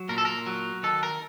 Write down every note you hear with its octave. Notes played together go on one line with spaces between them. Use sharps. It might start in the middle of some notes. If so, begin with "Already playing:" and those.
Already playing: F#3
A#2 A#4
A4
A#4
F#3
D#3 A4
A#4